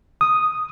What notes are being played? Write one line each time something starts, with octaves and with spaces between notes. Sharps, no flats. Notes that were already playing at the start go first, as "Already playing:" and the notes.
D#6